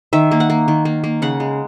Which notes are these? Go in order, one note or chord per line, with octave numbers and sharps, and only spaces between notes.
D#3 E5
A#3
F#5
A#3
D#3
A#3
A#3
C#3 F#5
G#3